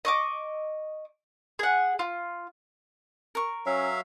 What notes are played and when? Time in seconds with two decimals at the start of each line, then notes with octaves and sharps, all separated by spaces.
0.05 D#5 C#6 D6
1.59 G#4 F#5
1.99 F4
3.35 A#4 C#6
3.66 F#3 C#4 E5 F5